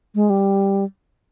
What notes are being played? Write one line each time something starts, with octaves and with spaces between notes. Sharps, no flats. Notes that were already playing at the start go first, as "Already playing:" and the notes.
G#3
G3